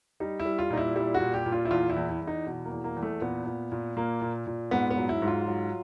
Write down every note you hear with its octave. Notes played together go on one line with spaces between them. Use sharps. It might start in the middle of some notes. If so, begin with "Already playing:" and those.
G3 D#4
E4
G3
F4
A#2 D#4
E4
G3 E4
F#4
A#2
G4
A#2
F4
E4
E2 F4
E4
E2
E4
E2
D#4
B2
A#3
E2
A#3
E2
A3
A#2 B3
A#2
A#2
A#2 A#3
A#2
A#2
G#2 B3
B3
F#3
E4
G#2
F4
F#3